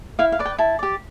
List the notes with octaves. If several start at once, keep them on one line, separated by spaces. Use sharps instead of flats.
E4 F5
F5
B4 D5
G5
E4 A5
G4 D5